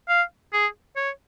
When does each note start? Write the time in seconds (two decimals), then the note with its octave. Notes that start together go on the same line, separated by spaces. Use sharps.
0.09 F5
0.53 G#4
0.96 C#5